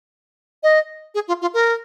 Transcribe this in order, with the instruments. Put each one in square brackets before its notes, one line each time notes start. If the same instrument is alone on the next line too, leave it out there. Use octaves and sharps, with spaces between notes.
[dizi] D#5
G#4
F4
F4
A#4